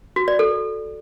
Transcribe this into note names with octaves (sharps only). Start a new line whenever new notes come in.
F#4
D5
A4